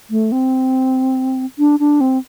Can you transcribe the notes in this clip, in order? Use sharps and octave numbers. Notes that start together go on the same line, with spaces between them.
A3
C4
D4
D4
C4